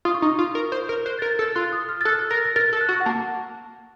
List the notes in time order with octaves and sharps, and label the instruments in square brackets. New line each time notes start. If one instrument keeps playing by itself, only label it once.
[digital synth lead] F4 [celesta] D#6
[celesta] C#6
[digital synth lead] D#4 [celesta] D#6
[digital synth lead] F4
A#4
C5
A#4
[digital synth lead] C5 [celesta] F#6
[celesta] A6
[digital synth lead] A#4
[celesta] A6
[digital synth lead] A4
[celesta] A6
[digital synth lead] F4 [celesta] F#6
[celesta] D#6
F6
A6
[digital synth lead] A4 [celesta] F#6
[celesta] A6
[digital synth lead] A#4 [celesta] A#6
[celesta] A#6
[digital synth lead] A#4 [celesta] A6
[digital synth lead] A4
[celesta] F#6
[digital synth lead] F#4
[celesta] F#5
[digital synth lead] A#3 [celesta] A5